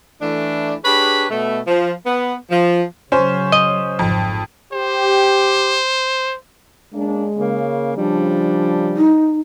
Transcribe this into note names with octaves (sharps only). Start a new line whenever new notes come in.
E3 A3 D4
D4 G4 G#4 B4 C#5 B5
B2 A3
F3
B3
F3
C#3 F#3 C#4 C5
D#5
G#1 F2 G#2
G4 C5
G#3 A#3 C#4 D4
C#3 A#3
C#3 F3 G3 D4
D#4